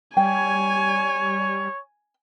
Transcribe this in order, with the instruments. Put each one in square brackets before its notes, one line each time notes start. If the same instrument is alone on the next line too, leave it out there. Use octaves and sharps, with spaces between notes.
[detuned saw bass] G3 [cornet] C#5 [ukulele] G5 [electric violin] G#5